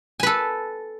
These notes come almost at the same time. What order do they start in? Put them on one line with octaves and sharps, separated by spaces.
G#5 B4 A4